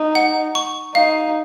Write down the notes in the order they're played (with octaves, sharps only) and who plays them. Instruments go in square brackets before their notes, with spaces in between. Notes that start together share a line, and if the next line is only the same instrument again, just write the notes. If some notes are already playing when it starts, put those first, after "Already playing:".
Already playing: [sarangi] D#4
[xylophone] F#5
C#6
[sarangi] D#4 [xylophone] F5